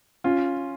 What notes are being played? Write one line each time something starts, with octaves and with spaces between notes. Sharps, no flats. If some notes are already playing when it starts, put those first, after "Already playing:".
C#4 F4